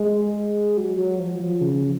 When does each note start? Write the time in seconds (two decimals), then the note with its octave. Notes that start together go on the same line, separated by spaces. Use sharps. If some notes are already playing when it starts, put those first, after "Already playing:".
Already playing: G#3
0.77 F#3
0.97 F#3
1.19 F3
1.40 F3
1.61 C#3